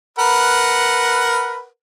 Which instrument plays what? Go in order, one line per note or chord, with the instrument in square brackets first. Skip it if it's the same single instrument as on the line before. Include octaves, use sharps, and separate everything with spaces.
[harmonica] A#4 B4 F#5